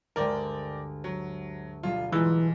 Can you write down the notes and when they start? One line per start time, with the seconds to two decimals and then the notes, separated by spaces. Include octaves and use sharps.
0.16 D2 G2 G#3 A#4 D5 G5
1.04 F#3
1.83 B1 G3 F4
2.13 G#2 E3 G#3 F4